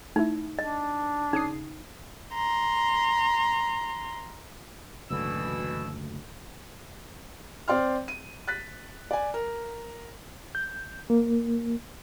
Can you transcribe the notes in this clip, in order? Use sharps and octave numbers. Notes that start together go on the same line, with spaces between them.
A3 D#4 E4
D4 D#5
C#3 D#4 D#6 C7
A#5 C6
F#1 D2 B2 D3 E3 E6
C4 D5 G5 C6 F6
D#7
F#6 A6 B6
D5 G#5
A#4
G6
A#3